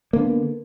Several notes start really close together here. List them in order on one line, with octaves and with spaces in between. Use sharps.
A#3 D3 B3